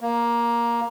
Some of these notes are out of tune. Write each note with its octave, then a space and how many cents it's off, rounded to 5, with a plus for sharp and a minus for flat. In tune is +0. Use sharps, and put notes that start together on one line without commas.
A#3 +10